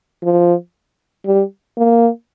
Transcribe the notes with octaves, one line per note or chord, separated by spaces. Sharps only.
F3
G3
A#3